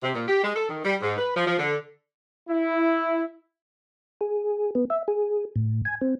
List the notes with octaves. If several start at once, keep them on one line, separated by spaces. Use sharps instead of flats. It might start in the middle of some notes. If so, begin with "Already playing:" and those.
C3
A#2
G4
G#3
A4
D#3
G3
G#2
B4
F3
F3
D3
E4
G#4
B3
E5
G#4
A2
G#5
C4